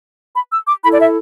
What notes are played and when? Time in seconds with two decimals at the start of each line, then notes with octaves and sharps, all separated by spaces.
0.35 B5
0.52 E6
0.67 D6
0.84 E4 A4 B5
0.93 D5
0.99 E5